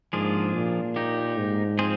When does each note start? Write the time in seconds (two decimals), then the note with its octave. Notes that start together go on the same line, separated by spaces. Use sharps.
0.13 G#2 F3 A#3 D4 F4 G#4
0.55 A#2
0.96 A#3 D#4 G4
1.38 G#2
1.79 F3 C4 F4 G#4 C5